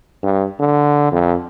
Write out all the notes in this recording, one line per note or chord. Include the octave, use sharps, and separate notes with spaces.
G2
D3
F2